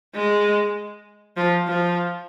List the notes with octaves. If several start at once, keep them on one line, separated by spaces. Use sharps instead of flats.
G#3
F3
F3